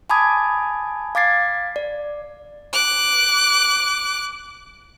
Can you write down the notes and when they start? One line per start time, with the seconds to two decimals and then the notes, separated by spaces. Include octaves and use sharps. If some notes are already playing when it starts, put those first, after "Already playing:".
0.10 G#5 A5 B5 D6 D#6 G#6
1.15 F5 D6 G#6 A6 C7
1.76 D5
2.73 D6 F#6